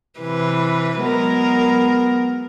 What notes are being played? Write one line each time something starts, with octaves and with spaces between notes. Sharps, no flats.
C3 E3 B4
F#3 G#3 B3 A#4